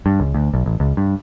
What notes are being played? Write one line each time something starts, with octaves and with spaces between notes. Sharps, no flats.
G2
C#2
D2
B1
A1
C#2
G2